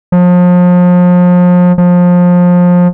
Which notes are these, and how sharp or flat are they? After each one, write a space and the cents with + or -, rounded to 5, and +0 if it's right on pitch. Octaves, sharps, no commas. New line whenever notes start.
F3 +35
F3 +25